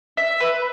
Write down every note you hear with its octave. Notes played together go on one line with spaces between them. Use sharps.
E5
B4